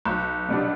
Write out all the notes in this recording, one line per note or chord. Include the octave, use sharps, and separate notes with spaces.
B1
B2 G3 B3 D4